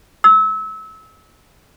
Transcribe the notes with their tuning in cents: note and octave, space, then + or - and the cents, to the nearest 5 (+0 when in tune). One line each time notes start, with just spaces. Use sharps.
E6 -25